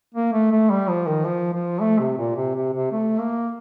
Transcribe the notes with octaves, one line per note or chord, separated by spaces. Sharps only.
A#3
A3
A3
G3
F3
D#3
F3
F3
A3
C3
A#2
C3
C3
C3
A3
A#3